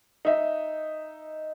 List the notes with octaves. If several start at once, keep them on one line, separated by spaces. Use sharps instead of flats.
D#4 E5